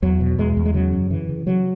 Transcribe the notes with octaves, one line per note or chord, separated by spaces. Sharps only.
E2 F#3
B2
E2 G#3
E2
G#3
C#3 F#3
F#2
C#3 E3
C#3
C#3 F#3